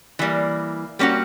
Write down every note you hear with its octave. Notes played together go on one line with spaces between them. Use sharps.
E3 G3 A#3
G3 A#3 C#4 F#4